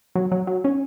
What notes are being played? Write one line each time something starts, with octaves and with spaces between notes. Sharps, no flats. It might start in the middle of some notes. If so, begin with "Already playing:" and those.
F#3
F#3
F#3
C#4